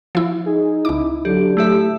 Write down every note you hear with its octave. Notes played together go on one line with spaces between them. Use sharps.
F3 E4
D#4 G#4
C#2 E4 D6
D3 F#3 G4
A2 A3 G4 E5